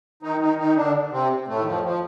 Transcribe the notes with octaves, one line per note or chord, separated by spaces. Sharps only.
D#3 D#4
D#3 D#4
D#3 D#4
D3 D4
C3 C4
A2 A3
D#3
F2 F3
F3